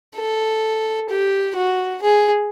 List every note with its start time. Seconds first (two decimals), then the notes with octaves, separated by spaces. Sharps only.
0.17 A4
1.10 G4
1.56 F#4
2.02 G#4